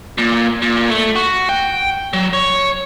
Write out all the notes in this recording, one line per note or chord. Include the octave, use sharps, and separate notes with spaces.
A#2
A#2
A3
F#4
G5
F#3
C#5